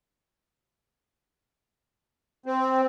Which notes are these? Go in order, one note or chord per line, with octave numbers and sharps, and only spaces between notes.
C4